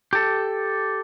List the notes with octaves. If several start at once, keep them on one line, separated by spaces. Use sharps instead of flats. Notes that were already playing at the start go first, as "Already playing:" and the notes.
G4 A4